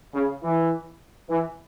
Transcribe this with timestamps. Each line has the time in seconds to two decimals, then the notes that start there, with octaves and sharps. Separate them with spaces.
0.14 C#3
0.43 E3
1.30 E3